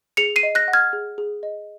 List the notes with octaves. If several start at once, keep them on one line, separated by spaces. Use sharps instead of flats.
G#4 C#7 F7
C7 D#7
D#5
F#6 A#6
F#5
F6 G#6
G#4
G#4
D#5